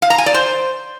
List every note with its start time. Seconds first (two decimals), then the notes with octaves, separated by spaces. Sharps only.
0.02 F5
0.10 A#5
0.18 G#5
0.26 D5
0.34 C5